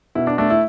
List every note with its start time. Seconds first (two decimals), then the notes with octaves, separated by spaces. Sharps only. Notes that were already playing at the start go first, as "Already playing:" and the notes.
0.15 B2 E4
0.27 D4
0.38 A3 D4
0.50 E4